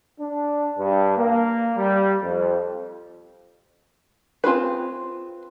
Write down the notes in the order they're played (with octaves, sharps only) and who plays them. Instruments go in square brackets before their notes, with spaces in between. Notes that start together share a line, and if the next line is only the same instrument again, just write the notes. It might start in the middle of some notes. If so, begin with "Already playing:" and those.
[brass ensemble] D4
G2
A#3
G3
F2
[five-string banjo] C4 F4 G#4 B4